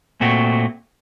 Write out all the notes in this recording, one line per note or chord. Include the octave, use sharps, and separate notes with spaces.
A#2 A3 C4 F#4